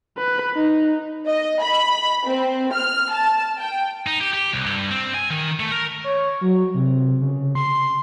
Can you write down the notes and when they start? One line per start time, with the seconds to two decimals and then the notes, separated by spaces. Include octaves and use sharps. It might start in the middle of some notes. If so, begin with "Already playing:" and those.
0.18 B4
0.56 D#4
1.28 D#5
1.62 B5
2.27 C4
2.73 F6
3.13 A5
3.58 G5
4.07 D#4
4.21 G4
4.33 G4
4.53 C2
4.66 G2
4.91 C4
5.14 G#5
5.30 D#3
5.60 A3
5.72 A#4
6.04 C#5
6.41 F#3
6.74 C3
7.21 C#3
7.55 C6